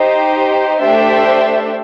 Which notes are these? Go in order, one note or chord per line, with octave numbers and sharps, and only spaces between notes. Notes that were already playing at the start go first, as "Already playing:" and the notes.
Already playing: D#4 G4 C5
A3 D4 G4 C5 E5